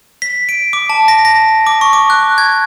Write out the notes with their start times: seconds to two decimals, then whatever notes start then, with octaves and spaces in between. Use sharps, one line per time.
0.22 B6
0.49 D7
0.73 D6
0.90 A5
1.08 A#6
1.25 A#6
1.67 D6
1.81 C#6
1.93 D6
2.10 F#6
2.38 G#6